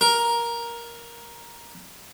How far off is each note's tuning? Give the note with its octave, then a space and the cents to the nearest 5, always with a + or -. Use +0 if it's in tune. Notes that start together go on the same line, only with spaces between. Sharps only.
A#4 +10